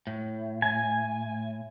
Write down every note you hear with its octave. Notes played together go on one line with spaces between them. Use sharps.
A2
G#5